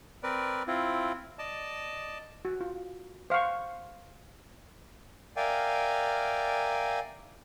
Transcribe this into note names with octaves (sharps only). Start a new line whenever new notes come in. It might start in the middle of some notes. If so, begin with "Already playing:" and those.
C4 A#4 B4 D5
C4 E4 F4
D5 D#5 A5
F#4
F4
C5 F5 F#5 C#6
A#4 D5 E5 F5 G5 G#5